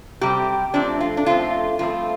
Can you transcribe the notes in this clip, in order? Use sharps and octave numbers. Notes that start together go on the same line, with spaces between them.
C3 G3 C4 G4
F2 F3 A3 C4 D4
F4
D4
F2 F3 A3 C4 F4
G2 F3 A3 C4 F4